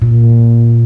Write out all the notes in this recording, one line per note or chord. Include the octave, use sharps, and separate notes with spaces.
A#2